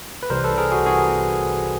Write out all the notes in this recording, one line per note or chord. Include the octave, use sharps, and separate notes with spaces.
B4
C2 C3 E3 G3 A#4 C5
A4 B4
G#4 A#4
F#4 G#4
C3 E3 F#4 G#4